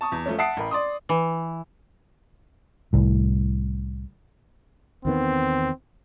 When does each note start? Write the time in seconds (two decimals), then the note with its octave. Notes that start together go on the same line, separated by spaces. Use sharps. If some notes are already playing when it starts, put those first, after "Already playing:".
0.01 A5 C#6 D#6
0.12 E2
0.26 F3 A3 C#4
0.38 E5 F#5 A5 D#6 C7 D7
0.57 A1 A#4 B5
0.71 D5 C6 D#6
1.09 E3
2.93 C2 A2
5.05 E2 D#3 B3 C4